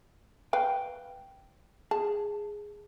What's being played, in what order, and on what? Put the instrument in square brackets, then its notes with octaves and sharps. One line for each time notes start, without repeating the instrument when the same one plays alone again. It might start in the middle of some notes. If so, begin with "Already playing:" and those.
[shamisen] B4 F5 [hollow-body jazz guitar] G5
[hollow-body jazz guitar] G#4 [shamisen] A5